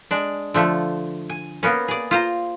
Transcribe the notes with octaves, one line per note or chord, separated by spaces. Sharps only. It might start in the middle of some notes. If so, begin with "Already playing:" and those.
G#3 D4
D3 F3 A3
G#5
A#3 B3 C#4
G#4 D5
F4 C5 A#5